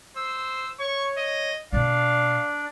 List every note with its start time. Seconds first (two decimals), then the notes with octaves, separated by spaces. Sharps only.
0.16 C5 E6
0.80 C#5 C#6
1.17 D#5
1.72 B2 A#3 D4 D5 F5